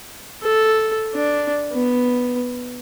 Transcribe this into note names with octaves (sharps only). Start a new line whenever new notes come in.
A4
D4
B3